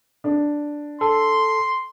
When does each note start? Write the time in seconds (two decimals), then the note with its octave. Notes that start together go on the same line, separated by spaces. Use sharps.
0.24 D4
1.01 A4 C6